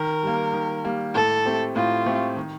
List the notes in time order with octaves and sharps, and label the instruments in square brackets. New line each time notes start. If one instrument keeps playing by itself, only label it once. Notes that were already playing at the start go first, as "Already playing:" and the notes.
Already playing: [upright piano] D#3 [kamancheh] A#4
[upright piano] G3 A#3
D#3
G3 A#3
[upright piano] A2 [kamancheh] A4
[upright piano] A3 C4 G4
[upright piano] A2 [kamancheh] F4
[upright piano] A3 C4 G4
D#3